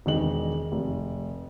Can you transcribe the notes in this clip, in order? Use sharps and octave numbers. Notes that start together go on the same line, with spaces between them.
E1 D#3 D#5 F#7
F1